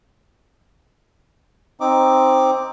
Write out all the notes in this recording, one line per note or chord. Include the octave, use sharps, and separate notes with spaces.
C4 D#4 D6